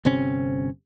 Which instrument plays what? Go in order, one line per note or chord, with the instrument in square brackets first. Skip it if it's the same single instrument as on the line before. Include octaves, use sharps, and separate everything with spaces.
[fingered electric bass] G1 C3 C4 C#4